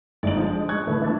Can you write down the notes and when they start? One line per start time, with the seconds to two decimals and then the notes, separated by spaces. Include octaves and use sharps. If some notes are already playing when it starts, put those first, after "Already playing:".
0.23 G1 G#3 A3 D#4 D5 F#7
0.36 F3 G#3 D4
0.69 C#6 F#6 G#6
0.87 A2 D3 E3 A3
1.02 E3 A3 D4